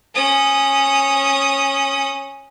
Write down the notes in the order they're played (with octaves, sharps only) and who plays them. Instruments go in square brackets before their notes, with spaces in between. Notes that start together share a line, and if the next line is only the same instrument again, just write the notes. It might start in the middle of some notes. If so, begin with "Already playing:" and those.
[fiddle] C#4 D#6